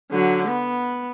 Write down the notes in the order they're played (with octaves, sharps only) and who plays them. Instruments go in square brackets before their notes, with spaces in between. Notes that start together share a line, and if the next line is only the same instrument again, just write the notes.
[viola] D3 F#3
B3